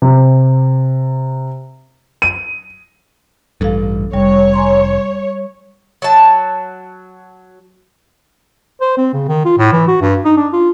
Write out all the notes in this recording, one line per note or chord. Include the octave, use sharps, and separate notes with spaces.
C3
D#7
A1 G2 A4 F5
F1 G3 C#5
G#5 A#5 C6
F#3 A5
C5
C4
C#3
D#3
F4
A2
E3
F#4
G2
D#4
D4
F4